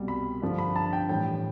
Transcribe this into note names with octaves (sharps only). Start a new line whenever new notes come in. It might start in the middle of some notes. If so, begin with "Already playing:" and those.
Already playing: C2 B2 G3
B5
G2 D3 F3
B5
A5
G5
A2 E3 G3 G5